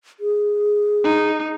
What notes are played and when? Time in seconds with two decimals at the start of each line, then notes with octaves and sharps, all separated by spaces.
0.20 G#4
1.04 D#4